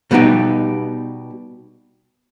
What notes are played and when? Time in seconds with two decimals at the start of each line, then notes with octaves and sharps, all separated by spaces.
0.11 B2 G3 B3 D#4 G4